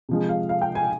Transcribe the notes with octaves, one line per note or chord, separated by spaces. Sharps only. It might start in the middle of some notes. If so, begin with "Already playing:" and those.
C3 F3 G#3
F5
F5
G5
G#5